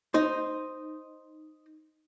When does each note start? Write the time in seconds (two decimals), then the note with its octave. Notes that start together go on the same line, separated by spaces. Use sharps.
0.14 D#4 C5